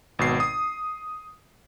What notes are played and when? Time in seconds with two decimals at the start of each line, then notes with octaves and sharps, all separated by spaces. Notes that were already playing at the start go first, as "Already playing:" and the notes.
0.19 G#1 B2 C7
0.40 D#6